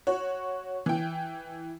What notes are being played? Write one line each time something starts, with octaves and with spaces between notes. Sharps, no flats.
F#4 C#5
E3 G5